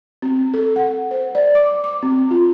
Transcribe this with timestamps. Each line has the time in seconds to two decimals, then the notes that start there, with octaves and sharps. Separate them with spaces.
0.22 C4
0.54 A4
0.76 F#5
1.11 C5
1.35 D5
1.55 D6
1.84 D6
2.03 C4
2.31 F4